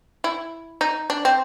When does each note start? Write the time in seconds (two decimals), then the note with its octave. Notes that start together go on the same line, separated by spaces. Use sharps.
0.24 E4
0.81 D#4
1.10 D4
1.25 C4